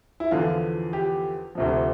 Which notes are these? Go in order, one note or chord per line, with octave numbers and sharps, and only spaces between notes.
E4
E2 D3 F3 F4
G4
D2 C3 F3